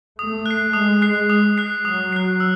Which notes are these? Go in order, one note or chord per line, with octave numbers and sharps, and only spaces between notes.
A3 D#6
F#6 C7
G#3 D#6
F#6 C7
D#6
F#6 C7
F#3 D#6
F#6 C7
E6